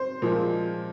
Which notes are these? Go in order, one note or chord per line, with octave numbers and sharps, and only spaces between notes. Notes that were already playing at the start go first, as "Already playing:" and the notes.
Already playing: C5
A#2 F3 G#3